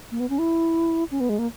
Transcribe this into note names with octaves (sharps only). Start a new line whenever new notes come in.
A#3
B3
C#4
E4
C#4
B3
G#3
A#3